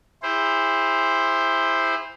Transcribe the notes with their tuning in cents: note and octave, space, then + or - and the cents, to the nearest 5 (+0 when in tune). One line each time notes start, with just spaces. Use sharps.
E4 +0 G#4 -45 C5 +0